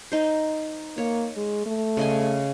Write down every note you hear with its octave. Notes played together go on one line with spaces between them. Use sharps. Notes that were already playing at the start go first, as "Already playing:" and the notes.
D#4 C5
A#3 C#5
G#3
A3
C#3 D#5 G#5